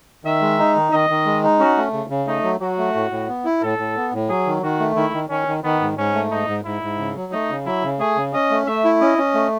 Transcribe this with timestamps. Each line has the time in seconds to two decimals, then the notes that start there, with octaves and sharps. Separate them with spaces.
0.25 D#3 E5
0.41 G#3
0.59 D#4
0.76 D#3
0.92 D#3 D#5
1.10 D#3
1.26 G#3
1.43 D#4
1.59 C#4 F#4
1.77 A3
1.93 C#3
2.10 C#3
2.27 A3 D#4
2.43 F#3
2.60 F#3 F#4
2.78 A3
2.95 A2
3.11 A2
3.29 B3
3.45 E4
3.62 A2 A4
3.79 A2
3.96 B3
4.13 A2
4.29 F#3 G#4
4.47 D#3
4.62 D#3 F#4
4.80 A3
4.96 D#3 E4
5.13 D#3
5.30 D#3 C#4
5.47 D#3
5.64 D#3 B3
5.81 G#2
5.97 G#2 C#4
6.14 A3
6.31 G#2 D#4
6.48 G#2
6.65 G#2 E4
6.82 G#2
6.99 C#3
7.16 F#3
7.32 A3 D#4
7.50 C#3
7.66 F#3 E4
7.83 C#3
7.99 A3 G#4
8.17 C#3
8.33 C#4 D#5
8.50 A3
8.67 A3 E5
8.84 E4
9.01 C#4 D#5
9.18 C#4
9.34 A3